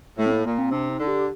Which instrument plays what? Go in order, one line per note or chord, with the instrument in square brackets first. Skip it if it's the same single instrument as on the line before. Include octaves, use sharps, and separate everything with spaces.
[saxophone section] A2 [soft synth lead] A3
[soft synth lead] C4
A#3
[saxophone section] A#2 [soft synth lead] A#3
[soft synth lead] C4
[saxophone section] C3 [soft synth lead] D4
[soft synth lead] D#4
[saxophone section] D3
[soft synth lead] G4